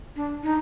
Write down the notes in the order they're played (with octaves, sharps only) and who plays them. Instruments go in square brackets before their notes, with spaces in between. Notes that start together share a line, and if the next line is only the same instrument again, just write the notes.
[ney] D4
D#4